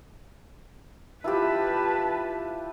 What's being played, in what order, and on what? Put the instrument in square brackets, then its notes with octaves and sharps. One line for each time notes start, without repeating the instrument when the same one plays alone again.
[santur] E4 F4 G4 [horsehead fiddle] B4 A5